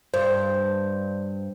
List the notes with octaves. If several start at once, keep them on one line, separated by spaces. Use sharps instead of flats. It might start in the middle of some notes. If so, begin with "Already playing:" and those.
G2 C5